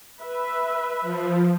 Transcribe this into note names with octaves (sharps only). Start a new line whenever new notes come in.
B4 E5
F3